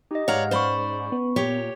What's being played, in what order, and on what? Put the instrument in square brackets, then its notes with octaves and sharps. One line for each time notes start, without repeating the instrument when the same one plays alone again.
[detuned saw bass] D#4 [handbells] G4 D#5
[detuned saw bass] G#2 [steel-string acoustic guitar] C#5 D5 A#5 [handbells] F5 F#5 F6
[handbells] C#4 B5 C#6 [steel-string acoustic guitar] C5 D5
[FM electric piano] B3
[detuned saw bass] A#2 [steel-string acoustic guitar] G4 C#5